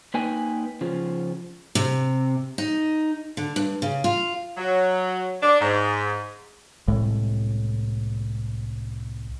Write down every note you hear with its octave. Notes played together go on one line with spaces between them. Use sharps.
A#3 D#4 B4 G5 G#5
C#3 F3
C3
D#4
D3
G2
C#3
F4
F#3
D4
G#2
C2 A2 G#3